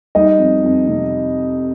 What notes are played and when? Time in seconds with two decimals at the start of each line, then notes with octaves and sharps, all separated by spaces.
0.15 G3 D#4 D#5
0.39 F2
0.63 F2
0.87 C3